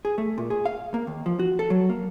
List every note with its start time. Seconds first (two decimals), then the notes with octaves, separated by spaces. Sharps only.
0.05 G#4
0.18 A3
0.38 A#2
0.50 G#4
0.66 F5
0.94 A#3
1.07 D#2
1.26 F3
1.39 F#4
1.59 A4
1.70 F#3
1.90 A#3